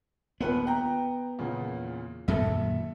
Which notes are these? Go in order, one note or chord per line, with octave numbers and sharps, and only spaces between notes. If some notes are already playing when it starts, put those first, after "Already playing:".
D#2 A#2 B3 B4
G5 A#5
E2 A#2 C#3
F#2 A#2 D#3 A4 E5